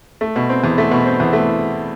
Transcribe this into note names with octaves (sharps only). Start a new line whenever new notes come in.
A3
B2
C4
E2
A3
B2
C4
E2
A3